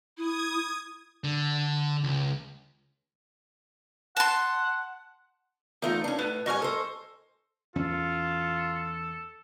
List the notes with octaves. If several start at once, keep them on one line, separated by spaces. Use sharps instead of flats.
E4 D#6 G#6
D3
C#2
F#5 A5 C6
E2 A3 D#4 F4
C#4 D4
A2 B3
G#2 G3 D#5 G#5 C#6 F6
A4 C5
E2 C#4 F4 A4